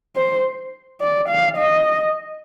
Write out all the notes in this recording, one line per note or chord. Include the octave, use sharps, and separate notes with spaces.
C5
D5
F5
D#5